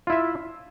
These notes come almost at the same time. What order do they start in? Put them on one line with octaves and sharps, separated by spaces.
F4 E4 E5